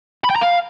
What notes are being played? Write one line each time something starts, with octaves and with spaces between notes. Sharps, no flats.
B5
G5
A#5
F5